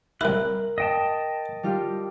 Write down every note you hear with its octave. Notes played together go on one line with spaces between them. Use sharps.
C2 E4 A#4 F#6
D#5 G5 A5
G3 F4 G4